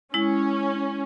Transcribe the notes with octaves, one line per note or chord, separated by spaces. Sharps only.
G#3 C#4 E4